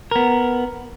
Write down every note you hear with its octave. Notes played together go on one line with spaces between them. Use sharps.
B3 A#4